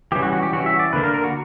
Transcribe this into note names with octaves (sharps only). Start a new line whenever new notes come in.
E3 G3 C#4 G4
F#4
F#4
G4
E3 G3 C#4 F#4
E5
D5
D3 A#3 D4 B4
A#4
A#4
F#4